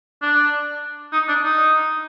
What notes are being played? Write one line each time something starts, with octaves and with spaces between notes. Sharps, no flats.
D4
D#4
D4
D#4